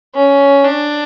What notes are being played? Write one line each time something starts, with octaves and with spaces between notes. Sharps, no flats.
C#4
D4